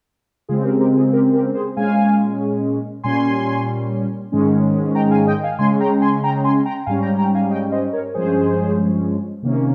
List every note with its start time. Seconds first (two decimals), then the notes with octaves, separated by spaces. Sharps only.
0.49 C#3 G#3 C4 F4 G#4
0.64 G4 A#4
0.80 G4 A#4
0.96 F4 G#4
1.13 G4 A#4
1.33 G4 A#4
1.54 G#4 C5
1.76 A#2 G#3 C#4 F5 G#5
3.04 A#2 G3 C#4 G#5 C6
4.32 G#2 D#3 G#3 C#4
4.95 G5 A#5
5.11 F5 G#5
5.27 D#5 G5
5.44 F5 G#5
5.59 C#3 G#3 C#4 G#5 C6
5.80 G5 A#5
6.01 G#5 C6
6.24 G5 A#5
6.44 G#5 C6
6.65 G5 A#5
6.86 G#2 G3 C#4 F5 G#5
7.02 G5 A#5
7.18 G5 A#5
7.35 F5 G#5
7.50 D#5 G5
7.72 C5 D#5
7.93 A#4 C#5
8.14 G2 F3 G#3 C#4 G#4 C5
9.43 C3 D#3 A#3 C#4